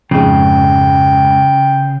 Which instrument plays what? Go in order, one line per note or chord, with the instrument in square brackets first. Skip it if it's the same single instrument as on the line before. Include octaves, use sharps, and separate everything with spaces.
[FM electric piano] F2 G#2 G#3 [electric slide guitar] C#3 [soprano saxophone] G5